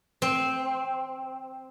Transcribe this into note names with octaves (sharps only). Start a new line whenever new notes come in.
C4